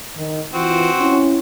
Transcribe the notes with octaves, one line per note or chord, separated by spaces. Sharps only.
D#3 D#4
E3 C4 F4 F#4
C#4 E4